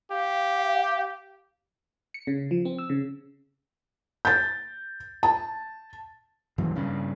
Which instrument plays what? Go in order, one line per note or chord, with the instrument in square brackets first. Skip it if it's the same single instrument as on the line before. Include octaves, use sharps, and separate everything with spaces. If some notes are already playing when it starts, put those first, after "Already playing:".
[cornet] G4 [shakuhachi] F5
[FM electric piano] C#7
C#3
F3
C4
E6
C#3
[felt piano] G6 A6
A5
[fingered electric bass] F#1 G2 E3 F#3
G2 C#3